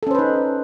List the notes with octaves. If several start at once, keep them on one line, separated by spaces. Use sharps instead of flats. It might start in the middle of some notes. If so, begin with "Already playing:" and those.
C#4 D#4 A4 B4 C5